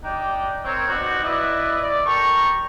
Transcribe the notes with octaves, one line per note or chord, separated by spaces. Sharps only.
D4 D#4 G4 D5 G5
C4 A#4 C#5
B3 C4 D4 D#4 F#4
E4 B4 D5 D#5
D5
G4 A4 A#4 A#5 C#6